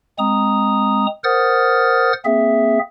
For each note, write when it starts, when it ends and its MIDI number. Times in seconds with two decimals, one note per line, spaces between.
0.18 1.06 56
0.18 1.06 60
0.18 1.06 82
0.18 1.06 87
1.24 2.13 70
1.24 2.13 72
1.24 2.13 78
1.24 2.13 87
1.24 2.13 89
1.24 2.13 93
2.25 2.79 58
2.25 2.79 60
2.25 2.79 68
2.25 2.79 76